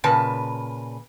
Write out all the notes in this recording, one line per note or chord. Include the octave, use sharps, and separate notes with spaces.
A#2 C#3 B4 A5